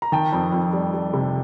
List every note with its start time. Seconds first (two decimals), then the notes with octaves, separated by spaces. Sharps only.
0.02 A#5
0.12 D#3 G5 A5
0.33 F2
0.52 F2
0.73 G3
0.93 G3
1.14 C3